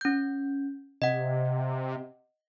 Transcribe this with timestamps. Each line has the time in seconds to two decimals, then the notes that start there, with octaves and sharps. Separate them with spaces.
0.01 C#4 G6
1.02 C3 D#5 F#5